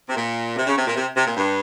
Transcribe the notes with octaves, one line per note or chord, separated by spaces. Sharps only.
C3
A#2
C3
C#3
C3
A#2
C3
C3
A#2
G2